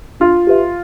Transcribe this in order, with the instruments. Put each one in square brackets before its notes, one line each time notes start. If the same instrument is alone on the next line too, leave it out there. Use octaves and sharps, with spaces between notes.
[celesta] D4 [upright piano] F4
[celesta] G4 B4 E5